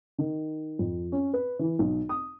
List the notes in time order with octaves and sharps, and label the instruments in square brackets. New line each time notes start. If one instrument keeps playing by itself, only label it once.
[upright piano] D#3
F2
C#4
B4
E3
B1
D#6